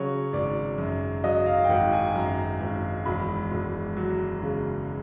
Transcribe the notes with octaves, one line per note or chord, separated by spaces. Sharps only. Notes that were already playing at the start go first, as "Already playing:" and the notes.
Already playing: C#3 F#3 C#5
G#1 D5
F#2
F#3 D#5
F5
G5
G#1 F#5
G#5
F#2 A#5
G#1
E1 B5
E1
F#3
C#3